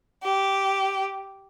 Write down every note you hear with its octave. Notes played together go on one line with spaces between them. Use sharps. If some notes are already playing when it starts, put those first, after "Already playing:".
G4